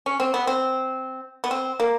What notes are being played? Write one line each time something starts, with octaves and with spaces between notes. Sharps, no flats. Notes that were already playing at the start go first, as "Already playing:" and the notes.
C#4
C4
B3
C4
B3
C4
A#3